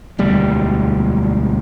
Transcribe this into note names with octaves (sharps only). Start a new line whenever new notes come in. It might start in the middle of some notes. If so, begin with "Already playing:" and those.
E1 D2 G3